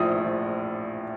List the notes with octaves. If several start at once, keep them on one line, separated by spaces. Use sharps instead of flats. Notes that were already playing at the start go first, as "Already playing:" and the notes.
Already playing: A#1 A2 F3 D#6
F3